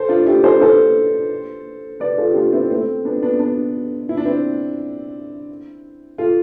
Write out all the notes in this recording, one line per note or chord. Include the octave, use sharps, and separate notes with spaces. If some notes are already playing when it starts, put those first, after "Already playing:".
Already playing: A4 C5
D4 F4
E4 G4
A4 C5
A4 C5
B4 D5
F4 A4
G4
D4 F4
C4 E4
A3 C4
B3 D4
B3 D4
B3 D4
E4
D4
C4 E4
F4 A4